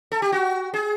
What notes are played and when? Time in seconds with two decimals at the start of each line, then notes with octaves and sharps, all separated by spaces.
0.12 A4
0.22 G4
0.32 F#4
0.74 G#4